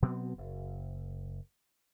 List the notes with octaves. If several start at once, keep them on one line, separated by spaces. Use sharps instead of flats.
B2 F#3 B3 C4
F#1